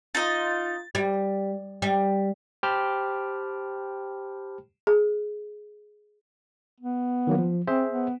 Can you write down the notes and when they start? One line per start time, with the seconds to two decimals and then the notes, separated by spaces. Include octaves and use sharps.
0.15 D#4 F4 D#5 A6
0.95 G3
1.82 G3
2.63 G4 C5 G5 A5 B5 F6
4.87 G#4
6.80 B3
7.27 D#3 F#3 A#3
7.38 F3
7.67 C4 G#4 C5 E5
7.89 B3